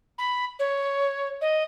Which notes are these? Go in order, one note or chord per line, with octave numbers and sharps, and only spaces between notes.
B5
C#5
D#5